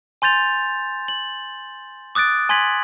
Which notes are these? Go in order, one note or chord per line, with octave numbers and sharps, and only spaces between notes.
G#5 C6 G6 A6 F7
F#7
D6 D#6 F#6 A6 D7
G#5 C6 G#6 B6 F#7